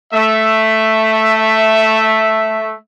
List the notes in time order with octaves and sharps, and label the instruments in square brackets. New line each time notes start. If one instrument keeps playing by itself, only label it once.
[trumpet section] A3 E5